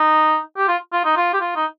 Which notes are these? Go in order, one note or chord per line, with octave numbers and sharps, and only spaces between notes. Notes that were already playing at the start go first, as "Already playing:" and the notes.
Already playing: D#4
G4
F4
F4
D#4
F4
G4
F4
D#4